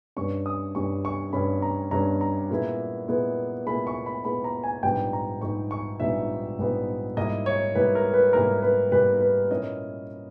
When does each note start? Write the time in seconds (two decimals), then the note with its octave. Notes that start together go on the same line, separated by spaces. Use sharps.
0.16 G2 G3 C#4 C#6
0.46 D#6
0.75 G2 G3 C#4 C#6
1.05 C#6
1.33 G2 G3 C#4 B5
1.62 A#5
1.91 G2 G3 C#4 A#5
2.21 A#5
2.50 A#2 G#3 B3 E4
3.08 A#2 G#3 B3 E4
3.66 A#2 G#3 B3 E4 B5
3.87 C#6
4.06 B5
4.25 A#2 G#3 B3 E4 B5
4.44 A#5
4.63 G#5
4.83 A#1 G#2 G3 B3 D#4 G5
5.13 A#5
5.41 A#1 G#2 G3 B3 D#4 C#6
5.71 C#6
6.00 A#1 G#2 G3 B3 D#4 E5
6.59 A#1 G#2 G3 B3 D#4
7.17 G#2 G3 A#3 E4 D#5
7.46 C#5
7.75 G#2 G3 A#3 E4 B4
7.95 A#4
8.14 B4
8.33 G#2 G3 A#3 E4 A#4
8.62 B4
8.91 G#2 G3 A#3 E4 B4
9.21 B4
9.50 A#2 A#3 C#4 E4 D#5